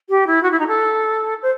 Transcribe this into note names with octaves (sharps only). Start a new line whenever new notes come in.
G4
E4
F#4
E4
D#4
A4
C5